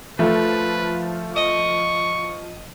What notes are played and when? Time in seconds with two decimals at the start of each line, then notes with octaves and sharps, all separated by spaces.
0.19 F3 A3 F4 B4
1.36 D#5 C#6